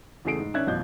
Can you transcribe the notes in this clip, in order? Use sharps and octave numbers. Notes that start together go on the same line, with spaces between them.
E2 C#3 A3 G#4 C7 D7
G#2
D#3 C#4 D4 E5 F#6 G#6
A1 F#2 B2 F4 G6